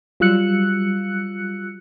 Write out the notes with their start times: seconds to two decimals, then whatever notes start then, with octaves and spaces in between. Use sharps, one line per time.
0.20 F#3 G3 F4 E6 F#6 C#7